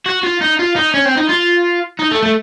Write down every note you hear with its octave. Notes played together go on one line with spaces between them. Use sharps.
F#4
F4
D#4
F4
D#4
C#4
C4
D#4
F4
D#4
A3
A3